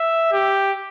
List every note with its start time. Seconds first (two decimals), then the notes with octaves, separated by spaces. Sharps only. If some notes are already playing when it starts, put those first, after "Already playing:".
Already playing: E5
0.32 G4